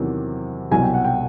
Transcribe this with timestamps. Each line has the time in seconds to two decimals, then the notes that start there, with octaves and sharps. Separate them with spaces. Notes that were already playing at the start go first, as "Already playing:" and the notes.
Already playing: E2 C3 D#3 F#3
0.71 C2 B2 F#3 G#5
0.83 G5
0.94 F#5
1.05 G5